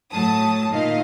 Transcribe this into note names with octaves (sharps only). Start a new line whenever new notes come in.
A2 F#3 A5 D#6
A#2 D#3 D#4 D#5 F5